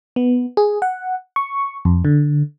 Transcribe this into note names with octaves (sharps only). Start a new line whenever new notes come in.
B3
G#4
F#5
C#6
F2
D3